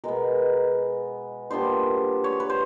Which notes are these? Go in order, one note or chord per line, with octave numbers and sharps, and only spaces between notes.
B2 G#3 B3 A#4
A#2 G3 B3 D4 C5
C#5
B4
C5